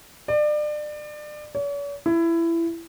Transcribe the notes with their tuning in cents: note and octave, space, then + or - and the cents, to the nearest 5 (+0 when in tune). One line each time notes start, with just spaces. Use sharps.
D5 +30
C#5 +45
E4 +20